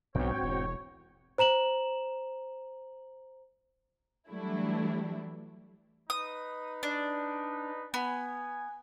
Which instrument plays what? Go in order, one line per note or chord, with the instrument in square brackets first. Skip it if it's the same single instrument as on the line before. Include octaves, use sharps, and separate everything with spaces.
[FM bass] B1 [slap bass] G#2 D4 [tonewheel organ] C4 F#4 G5 [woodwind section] C#5
[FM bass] E1
[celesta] C5 A#5 E7 F#7
[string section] E3 F#3 G3 A3 D4 E4
[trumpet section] D#4 B4 [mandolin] D#6
[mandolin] D4
[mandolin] B3 [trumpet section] G#5